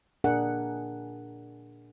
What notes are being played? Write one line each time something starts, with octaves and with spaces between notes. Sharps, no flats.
A#2 D4 G#4 A#4 F#5